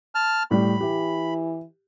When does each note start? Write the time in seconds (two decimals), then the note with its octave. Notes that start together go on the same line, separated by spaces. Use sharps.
0.15 A5 F6
0.51 A2 G3 B5
0.81 E3 G4